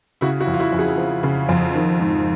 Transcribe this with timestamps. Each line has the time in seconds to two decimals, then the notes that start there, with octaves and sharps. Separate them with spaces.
0.21 C#3 E4 F#4
0.40 E4 F#4
0.47 F2
0.54 F4
0.59 E4 F#4
0.72 F2
0.79 F#4 G#4
0.97 F3
1.23 C#3
1.49 F2
1.75 D#3
2.00 G#2